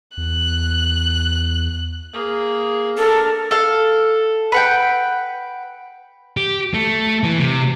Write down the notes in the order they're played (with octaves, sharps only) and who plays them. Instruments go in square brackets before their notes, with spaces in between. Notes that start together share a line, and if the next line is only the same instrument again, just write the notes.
[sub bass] E2 [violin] F#6
[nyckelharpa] A#3 G#4
[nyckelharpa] D4 A#4 [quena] A4
[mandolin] A4 F5
B4 F#5 G5
[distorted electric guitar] G4
A3
E3
C3